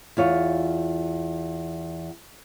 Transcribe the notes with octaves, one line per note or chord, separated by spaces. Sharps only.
E2 F4 C#5